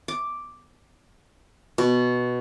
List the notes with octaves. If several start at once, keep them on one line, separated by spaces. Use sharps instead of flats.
D6
B2